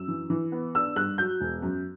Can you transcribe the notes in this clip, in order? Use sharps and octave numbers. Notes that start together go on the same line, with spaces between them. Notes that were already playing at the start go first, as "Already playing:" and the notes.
Already playing: F#2 E6
E3
E3
B3
D4 E6
G2 F#6
F#3 G6
E1
F#2